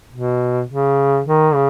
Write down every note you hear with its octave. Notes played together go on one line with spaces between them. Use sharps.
B2
C#3
D#3
C#3